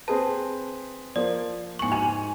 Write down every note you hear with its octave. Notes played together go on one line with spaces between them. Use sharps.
C4 G#4 B4 A5
F3 A#3 C5 D5
G#2 G#5 C#6 F#7
G#5 F7